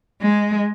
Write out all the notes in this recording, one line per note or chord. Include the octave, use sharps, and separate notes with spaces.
G#3